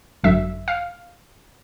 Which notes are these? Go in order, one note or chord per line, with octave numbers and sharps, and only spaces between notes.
G#1 F#2 D3 F#3 E5
F5